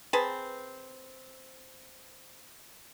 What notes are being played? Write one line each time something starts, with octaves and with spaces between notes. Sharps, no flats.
C4 G#4 B4 A5